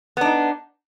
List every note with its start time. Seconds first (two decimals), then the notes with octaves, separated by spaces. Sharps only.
0.17 B3
0.21 D4
0.25 D#4